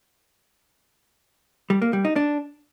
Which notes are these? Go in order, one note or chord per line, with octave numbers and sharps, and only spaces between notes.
G3
A#3
G3
D#4
D4